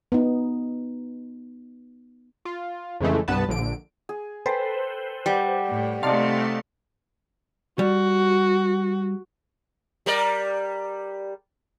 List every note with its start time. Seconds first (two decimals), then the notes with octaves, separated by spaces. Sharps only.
0.12 B3 D#4
2.45 F4
3.00 F2 C#3 E3 G#3 A3
3.28 C2 G2 B3 B4 A5
3.49 A#1 D3 D7
4.09 G#4
4.46 A4 B4 C5 G5 G#5
5.26 G3 D5 F#5
5.69 A2
6.03 C3 A3 D#4 D5 D#5 F5 A5 C6
7.79 G3 F#4
10.06 G3 A#4 D5